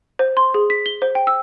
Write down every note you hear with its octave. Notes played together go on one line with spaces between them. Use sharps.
C5
C6
G#4
B6
G7
C5
G5
E6